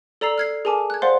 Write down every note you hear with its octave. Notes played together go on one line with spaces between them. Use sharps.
A4 D5 A#5 E6 C7
F6 G#6 C7
G#4 A#4 G#5 A5 D6
F#6 G#6
C5 D5 F5 F#5 C6